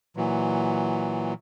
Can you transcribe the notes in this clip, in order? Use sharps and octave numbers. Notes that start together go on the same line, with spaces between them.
A#2 E3 F#3